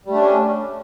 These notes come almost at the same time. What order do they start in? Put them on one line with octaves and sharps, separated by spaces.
G3 A3 D4 C#4